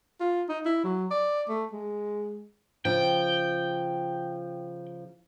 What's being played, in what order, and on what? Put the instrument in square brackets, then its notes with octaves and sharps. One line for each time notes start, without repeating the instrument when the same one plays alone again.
[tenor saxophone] F4
D#4
E4
F#3
D5
A3
G#3
[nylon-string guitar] C#3 F3 [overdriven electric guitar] G5